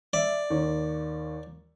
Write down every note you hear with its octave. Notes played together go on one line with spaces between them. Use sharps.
D5 E5
D#2 D#3 C#5